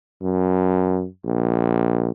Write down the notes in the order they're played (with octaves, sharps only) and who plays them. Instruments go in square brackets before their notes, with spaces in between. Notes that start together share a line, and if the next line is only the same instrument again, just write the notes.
[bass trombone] F#2
A#1